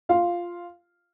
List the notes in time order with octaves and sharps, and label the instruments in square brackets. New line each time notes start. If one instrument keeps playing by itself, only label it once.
[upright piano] F4 F5